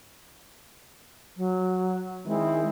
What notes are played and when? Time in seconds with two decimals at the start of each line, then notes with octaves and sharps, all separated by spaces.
1.37 F#3
2.26 D#3 G#3 C4 E4